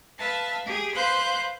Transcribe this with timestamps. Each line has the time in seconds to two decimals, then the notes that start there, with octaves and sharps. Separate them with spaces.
0.17 B4 E5 F5 A5
0.63 G4 G#4
0.94 B4 C5 F5 C6 F#6 G6